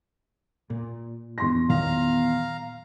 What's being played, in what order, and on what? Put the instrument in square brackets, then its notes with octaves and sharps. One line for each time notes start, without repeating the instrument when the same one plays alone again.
[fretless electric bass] A#2
[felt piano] E2 C6 A#6
[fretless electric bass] A#2 D#3 F#3 [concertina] F5 A#5